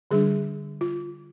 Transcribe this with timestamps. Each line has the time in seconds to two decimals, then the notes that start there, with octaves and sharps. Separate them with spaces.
0.11 D3 G3 D4 G#4
0.81 F4